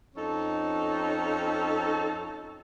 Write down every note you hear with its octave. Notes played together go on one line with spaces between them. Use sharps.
F2 C#4 D#4 A4